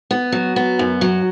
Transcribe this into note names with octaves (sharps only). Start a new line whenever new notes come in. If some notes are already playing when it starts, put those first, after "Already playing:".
B3
F#3
B3
F#2
F#3